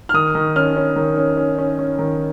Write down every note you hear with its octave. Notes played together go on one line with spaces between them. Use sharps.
F6
D#3 D#6
D#3
C#4 F6
C#4
D#3
C#4
C#4
C#4
C#4
D#3